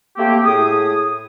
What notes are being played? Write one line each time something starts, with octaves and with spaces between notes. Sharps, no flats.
A3 A#3 C4 G4
A2 G#4 D#6